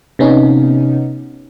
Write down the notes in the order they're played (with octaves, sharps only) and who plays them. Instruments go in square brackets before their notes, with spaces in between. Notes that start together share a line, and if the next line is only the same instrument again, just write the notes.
[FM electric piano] C3 B3 C#4 D#4